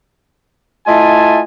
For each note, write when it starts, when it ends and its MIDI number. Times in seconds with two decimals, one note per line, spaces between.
0.86 1.39 57
0.86 1.39 64
0.86 1.39 65
0.86 1.39 75
0.86 1.39 80
0.86 1.39 81